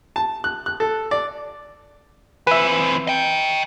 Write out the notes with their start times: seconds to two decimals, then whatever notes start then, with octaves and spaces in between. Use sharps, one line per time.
0.16 A5
0.44 F#6
0.66 F#6
0.80 A4
1.11 D5
2.47 E3 C4 B4 E5
3.07 D#5 G5